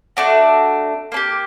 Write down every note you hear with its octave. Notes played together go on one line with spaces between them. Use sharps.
A3 D4 F#4
A#3 D4 G4